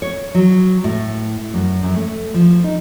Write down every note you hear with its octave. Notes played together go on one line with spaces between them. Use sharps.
C#5
F#3
A2
F#2
F#2
A3
F3
D#4